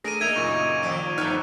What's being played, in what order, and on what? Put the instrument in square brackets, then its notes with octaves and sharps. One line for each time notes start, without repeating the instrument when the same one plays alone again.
[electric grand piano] A3 D4 G#4 [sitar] A#4 [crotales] A#6 D7 D#7
[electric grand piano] A#3 E5 [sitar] D#4 [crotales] G#6 D#7 F7
[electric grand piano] F#2 A#2 C#3 [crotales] C#6
[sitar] D#3 F3 D5
[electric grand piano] G1 F6 F#6 [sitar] F3 A3 B3 [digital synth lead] D#4